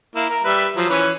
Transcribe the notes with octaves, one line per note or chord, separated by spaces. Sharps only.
A#3 E4
A#4
G3 B4 E5
F3 F#3
E3 C#4 B4